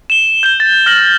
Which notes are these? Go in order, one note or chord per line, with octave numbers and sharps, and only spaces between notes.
E7 G7
G6 E7 G7
A6
F6 A#6 F#7